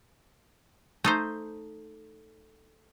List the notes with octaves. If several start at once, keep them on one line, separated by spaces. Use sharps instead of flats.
A3 D#4 C5